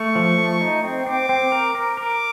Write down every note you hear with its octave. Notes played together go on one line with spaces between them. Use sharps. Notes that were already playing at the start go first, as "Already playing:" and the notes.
Already playing: A3 C#6
F3
A3
D#4
C4
C4 D6
C4
A#4
A#4
A#4 D6